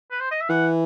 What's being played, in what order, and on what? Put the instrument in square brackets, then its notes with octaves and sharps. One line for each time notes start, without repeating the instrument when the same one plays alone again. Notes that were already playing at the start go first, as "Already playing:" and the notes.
[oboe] B4
C5
D#5
E5
[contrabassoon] E3 [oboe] F#5